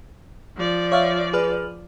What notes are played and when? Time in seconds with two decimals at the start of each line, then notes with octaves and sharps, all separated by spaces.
0.57 F3 D5
0.92 C#5 E5 F5
1.33 G#4 B4 F6